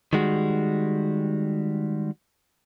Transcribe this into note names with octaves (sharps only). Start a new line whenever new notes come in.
D#3 G3 G#3 F#4